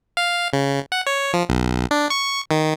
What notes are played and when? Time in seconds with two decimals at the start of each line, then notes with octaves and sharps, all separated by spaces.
0.17 F5
0.53 C#3
0.92 F#5
1.07 C#5
1.33 F3
1.49 B1
1.91 D4
2.10 C#6
2.51 D#3